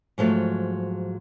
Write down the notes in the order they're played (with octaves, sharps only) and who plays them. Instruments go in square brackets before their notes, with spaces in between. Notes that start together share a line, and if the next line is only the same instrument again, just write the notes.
[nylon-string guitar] G#2 F3 F#3 A3